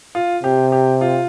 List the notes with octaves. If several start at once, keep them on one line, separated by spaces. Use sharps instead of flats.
F4
C3 G4
G4
F4